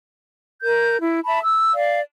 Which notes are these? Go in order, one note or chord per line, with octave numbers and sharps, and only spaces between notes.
A#4 G6
E4
E5 A5 B5
E6
D5 F5